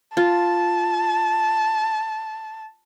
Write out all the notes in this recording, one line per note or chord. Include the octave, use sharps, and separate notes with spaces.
F4 A5